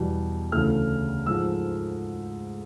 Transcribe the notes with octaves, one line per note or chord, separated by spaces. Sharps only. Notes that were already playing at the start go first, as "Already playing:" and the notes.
Already playing: E2 B2 G3
D2 C#3 E3 A3 F6
G#2 F3 G#3 E6